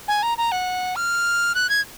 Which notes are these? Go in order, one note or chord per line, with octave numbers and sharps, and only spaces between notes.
G#5
A#5
A#5
F#5
F6
F#6
G#6